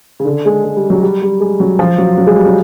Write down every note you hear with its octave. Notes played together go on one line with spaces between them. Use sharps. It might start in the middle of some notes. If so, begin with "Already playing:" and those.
C#3
D3
G#3
G#3
G3
F#3
G3
G3
G#3
F#3
F3
F#3
F#3
G#3
G3
F#3